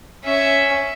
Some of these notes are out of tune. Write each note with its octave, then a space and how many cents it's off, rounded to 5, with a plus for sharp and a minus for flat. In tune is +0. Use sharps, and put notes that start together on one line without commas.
C#4 +0 E5 +0